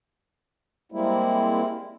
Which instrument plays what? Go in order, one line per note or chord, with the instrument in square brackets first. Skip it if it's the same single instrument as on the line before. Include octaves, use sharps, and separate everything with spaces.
[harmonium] G3 G#3 A#3 C4 E4